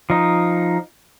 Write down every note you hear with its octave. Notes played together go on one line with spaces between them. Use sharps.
F3 D#4